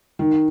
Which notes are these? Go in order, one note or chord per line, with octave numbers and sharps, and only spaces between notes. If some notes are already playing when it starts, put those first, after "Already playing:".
D#3